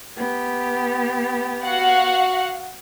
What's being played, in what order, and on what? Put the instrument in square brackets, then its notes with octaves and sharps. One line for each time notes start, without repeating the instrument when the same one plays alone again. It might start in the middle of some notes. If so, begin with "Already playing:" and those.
[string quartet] B3 G4
[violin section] F#4 F5 F#5